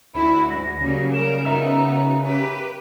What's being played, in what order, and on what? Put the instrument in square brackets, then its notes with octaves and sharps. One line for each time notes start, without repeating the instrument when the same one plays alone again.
[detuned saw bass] D2 [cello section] E4 F#4 [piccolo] B5
[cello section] G#2 [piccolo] A#6
[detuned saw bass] C#3 [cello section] F#3 G3 A#3
[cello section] G3 A#4 [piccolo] E7
[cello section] B3 D#4 F#4 [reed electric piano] A#4 E5 E6 [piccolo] A#5
[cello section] G4 B4